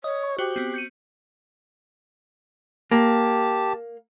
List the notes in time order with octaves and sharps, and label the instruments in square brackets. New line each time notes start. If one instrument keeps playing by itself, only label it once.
[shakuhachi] C#5 [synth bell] D#5 D#6
[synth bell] C#6
[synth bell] F#4 C5 F#6 [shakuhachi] G4
[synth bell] B3 C4 F#7
G6 C#7 D#7
[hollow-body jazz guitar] A#3 [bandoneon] G4 A5